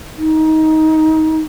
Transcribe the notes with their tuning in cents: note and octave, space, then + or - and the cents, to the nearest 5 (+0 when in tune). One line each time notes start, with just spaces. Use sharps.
D#4 +20